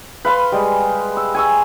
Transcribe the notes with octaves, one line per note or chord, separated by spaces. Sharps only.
B4 F5 B5 C6
G3 G#3
E6
G#5 C#6 E6